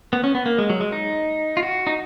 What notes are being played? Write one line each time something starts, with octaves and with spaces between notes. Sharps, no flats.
B3
C#4
B3
A#3
G#3
F#3
G#3
D#4
F4
F#4
D#4